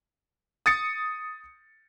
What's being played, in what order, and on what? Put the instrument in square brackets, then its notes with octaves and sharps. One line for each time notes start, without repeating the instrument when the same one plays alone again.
[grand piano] D#6 A6 C#7